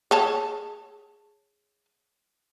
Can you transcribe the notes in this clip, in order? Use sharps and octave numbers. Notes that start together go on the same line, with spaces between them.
G#4 C#5 A5